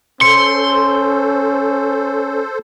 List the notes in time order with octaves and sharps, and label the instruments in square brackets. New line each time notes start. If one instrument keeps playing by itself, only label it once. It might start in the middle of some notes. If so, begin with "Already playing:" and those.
[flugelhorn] C#4 [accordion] A4 C5 [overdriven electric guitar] C6 [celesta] C#7